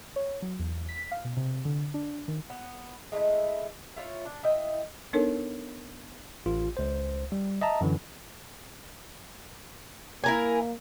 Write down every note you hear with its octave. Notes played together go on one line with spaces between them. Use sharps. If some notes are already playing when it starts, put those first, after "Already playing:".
C#5
F#3
E2
B6
F5
B2
C3
D3
D4
D#3
B3
G#3 A3 C#4 E4
E4 F4 C#5
D4
E4 D#5 G5
B3 D4 D#4 A4 A#4 C#5
A1 F4
C#2 C5
G3
D#5 E5 A5 A#5
F#2 D3 E3
A#3 E4 A#4 G#5